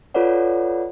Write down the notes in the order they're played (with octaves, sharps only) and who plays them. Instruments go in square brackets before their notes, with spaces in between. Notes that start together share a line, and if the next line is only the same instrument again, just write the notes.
[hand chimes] F4 A4 B4 C#5 D5 F#5